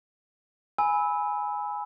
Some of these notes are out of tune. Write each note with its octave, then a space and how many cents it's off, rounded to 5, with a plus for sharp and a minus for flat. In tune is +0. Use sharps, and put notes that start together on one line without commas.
G#5 +0 B5 +0 E6 -20